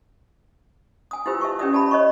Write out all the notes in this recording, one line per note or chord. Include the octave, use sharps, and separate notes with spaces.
G#5 D#6
E4 F4 G4 B4 C5 E6
E5 A5 C#6
C#4 G4 B4 D5 E5 D#6
D5 A5 B5
C#5 D#5 B5 C#6